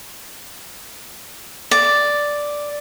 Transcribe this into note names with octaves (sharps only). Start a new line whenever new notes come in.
D5